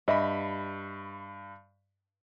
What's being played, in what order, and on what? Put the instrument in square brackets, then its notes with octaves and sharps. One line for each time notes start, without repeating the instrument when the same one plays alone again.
[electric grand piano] G2 B5 [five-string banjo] G4 D#5 E5